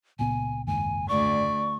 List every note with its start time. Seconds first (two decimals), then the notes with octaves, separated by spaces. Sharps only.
0.19 C#2 A#2 B3 G#5
0.67 F#1 D#2 G#2 G#5
1.08 D2 D5 C#6